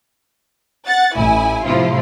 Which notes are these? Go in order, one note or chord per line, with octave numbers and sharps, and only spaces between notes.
F#5 A6
A1 E4 G#5
A2 C3 F3 E4 F4